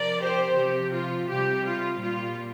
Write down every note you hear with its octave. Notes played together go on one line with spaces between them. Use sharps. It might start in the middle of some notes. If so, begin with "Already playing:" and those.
Already playing: C3 F3 A#4 D5
G4 C5
C3 F3 G4
F4
C3 G3 G4
F4
A#2 G3 F4